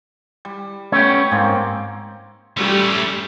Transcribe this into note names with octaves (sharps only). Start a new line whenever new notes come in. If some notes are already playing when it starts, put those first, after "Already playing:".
G3
A3 B3 C#4 C#5 G5
G#2 A#3 C4
G3 A3 C#4